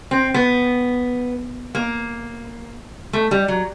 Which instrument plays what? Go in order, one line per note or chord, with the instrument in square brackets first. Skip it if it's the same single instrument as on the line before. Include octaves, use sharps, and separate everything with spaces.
[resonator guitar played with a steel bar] C4
B3
A#3
A3
G3
F#3